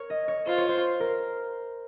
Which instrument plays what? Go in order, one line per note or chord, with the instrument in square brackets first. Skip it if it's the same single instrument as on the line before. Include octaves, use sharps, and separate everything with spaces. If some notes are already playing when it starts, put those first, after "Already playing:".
Already playing: [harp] A#4 C#5
D#5
C#5
[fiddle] F4 [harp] C5
[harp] C#5
C5
A#4